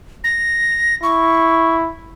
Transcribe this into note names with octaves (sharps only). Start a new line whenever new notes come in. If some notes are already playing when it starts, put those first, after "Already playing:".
A#6
E4 C#6